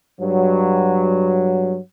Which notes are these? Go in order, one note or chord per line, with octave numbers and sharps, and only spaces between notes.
G2 F#3